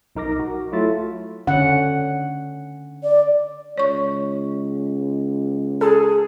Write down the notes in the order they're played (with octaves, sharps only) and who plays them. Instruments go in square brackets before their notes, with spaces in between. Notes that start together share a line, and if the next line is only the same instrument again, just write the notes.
[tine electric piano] B1 D#4 A#4 D6 A#6
F#4
F#3 A3 E4 F4 E5 A6
[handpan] D3 C#4 F#5
[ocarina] D5
[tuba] C#2 [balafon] C#5 C#6
[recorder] G#4 [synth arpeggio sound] A4 A5